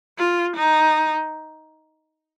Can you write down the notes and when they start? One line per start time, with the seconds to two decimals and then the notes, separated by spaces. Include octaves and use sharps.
0.18 F4
0.56 D#4